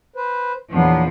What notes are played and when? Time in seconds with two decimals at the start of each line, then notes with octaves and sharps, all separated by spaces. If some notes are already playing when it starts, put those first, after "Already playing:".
0.16 B4 C5
0.73 E2 A#2 F3 F#3 B3 D4